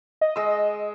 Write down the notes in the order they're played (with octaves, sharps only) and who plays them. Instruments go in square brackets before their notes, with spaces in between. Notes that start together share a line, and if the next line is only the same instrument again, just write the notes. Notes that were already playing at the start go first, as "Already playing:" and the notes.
[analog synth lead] D#5
[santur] G#3 E6